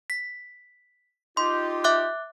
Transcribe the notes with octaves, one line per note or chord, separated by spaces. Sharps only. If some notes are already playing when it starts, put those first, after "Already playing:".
B6
D#4 F4 G4 C6
E5 D6 F#6